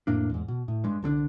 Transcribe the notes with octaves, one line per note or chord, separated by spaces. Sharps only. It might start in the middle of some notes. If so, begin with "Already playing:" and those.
F2 A2 A#3 D4
E2 G#2
B2
A2
G2 G#3
C2 D3 C4 D4